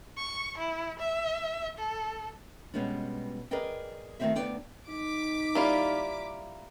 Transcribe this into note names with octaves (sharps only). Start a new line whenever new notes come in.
C#6
E4
E5
A4
B2 G3 G#3 B3 C#4 D4
G#4 A#4 B4 D5 D#5 G5
D#3 A3 A#3 C4 F#4 E5
D2 G#2 B3 D4 D5 G5
D#4 D6 B6
G3 A#3 E4 F4